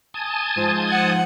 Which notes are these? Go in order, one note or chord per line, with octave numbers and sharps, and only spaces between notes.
G#5 A5 D#6
G#2 F3 C5
F#5